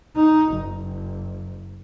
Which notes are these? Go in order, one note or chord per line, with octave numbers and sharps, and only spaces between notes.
D#4
F#1